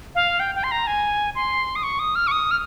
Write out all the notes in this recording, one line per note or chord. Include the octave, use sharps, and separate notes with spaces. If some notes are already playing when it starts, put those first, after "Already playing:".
F5
G5
G5
C6
A#5
G#5
C6
D#6
C#6
D#6
F6
C#6
D#6
F6